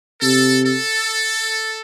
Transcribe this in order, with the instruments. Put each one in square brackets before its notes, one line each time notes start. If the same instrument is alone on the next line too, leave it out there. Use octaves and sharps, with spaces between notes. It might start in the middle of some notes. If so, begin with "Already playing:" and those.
[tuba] C3 [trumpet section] A4
[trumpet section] A4